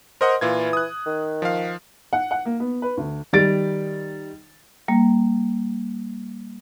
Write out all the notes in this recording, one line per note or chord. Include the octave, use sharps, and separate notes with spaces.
A#4 C5 D#5 F#5
A#2 E3 F4 G#6
D#6 F#6
D#3
F3 F5
F#5
F#5
A#3
B3
B4
D2
D#3 G3 A6 D7
G3 A#3